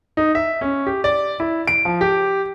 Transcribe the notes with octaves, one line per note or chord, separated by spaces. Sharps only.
D#4
E5
C#4
G4
D5
E4
D7
F3
G4